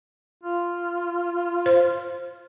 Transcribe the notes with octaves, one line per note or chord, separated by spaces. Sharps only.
F4
C5